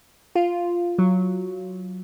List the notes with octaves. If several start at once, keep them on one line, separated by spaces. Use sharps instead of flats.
F4
F#3